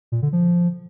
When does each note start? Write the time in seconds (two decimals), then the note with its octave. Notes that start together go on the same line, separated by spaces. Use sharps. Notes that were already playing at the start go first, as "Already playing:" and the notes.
0.12 A#2
0.22 D3
0.33 F3